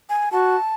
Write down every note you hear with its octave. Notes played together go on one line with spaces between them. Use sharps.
G#5
F#4 A5